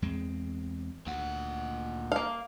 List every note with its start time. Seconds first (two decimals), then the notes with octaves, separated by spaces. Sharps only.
0.02 E2 G#3 C4
1.07 D2 A#2 F#5
2.12 A#3 F5